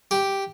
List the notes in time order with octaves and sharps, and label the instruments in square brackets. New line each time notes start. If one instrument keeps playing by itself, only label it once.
[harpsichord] G4